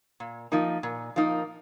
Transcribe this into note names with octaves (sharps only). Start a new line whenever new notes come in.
A#2
F3 A#3 D#4
A#2
F3 A#3 D#4